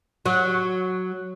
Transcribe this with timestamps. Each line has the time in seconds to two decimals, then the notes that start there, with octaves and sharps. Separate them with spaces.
0.26 F#3